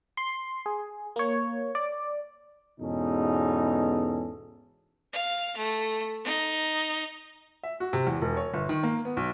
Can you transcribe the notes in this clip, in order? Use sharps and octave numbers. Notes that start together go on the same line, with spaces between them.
C6
G#4
A#3 C#5
D5
E2 G#2 B2 C#4 D#4 A4
F5
A3
D#4
E5
F#4
C3
E2
E1
C#5
G1
D#3
A#3
B3
B1